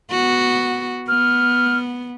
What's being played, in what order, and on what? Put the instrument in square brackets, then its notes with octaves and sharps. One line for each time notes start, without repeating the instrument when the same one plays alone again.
[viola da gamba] B3 F#4
[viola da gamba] B3 [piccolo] F6